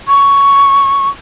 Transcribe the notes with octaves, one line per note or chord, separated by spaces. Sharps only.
C#6